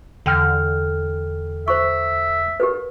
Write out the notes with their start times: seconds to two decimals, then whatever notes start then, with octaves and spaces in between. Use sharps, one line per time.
0.26 E2 D3 G5 F6
1.68 C5 E5 C#6
2.60 G4 A#4 B4